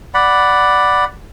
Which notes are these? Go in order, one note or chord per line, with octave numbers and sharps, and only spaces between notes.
D5 F#5 B5